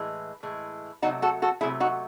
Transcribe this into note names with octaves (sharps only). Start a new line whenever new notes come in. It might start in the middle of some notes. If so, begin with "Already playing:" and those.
Already playing: A2 E3 G#3
A2 E3 G#3
C3 D#3 F#3 A3 D#4 F#4
F#4 A4
F#4 A4
C3 D#3 F#3 A3 E4 G#4
D#4 F#4